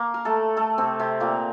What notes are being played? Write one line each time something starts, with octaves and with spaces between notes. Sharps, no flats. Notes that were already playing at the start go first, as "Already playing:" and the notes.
Already playing: A#3
A#4
A3 A4
A3 A4
C3 C4
C3 C4
A#2 A#3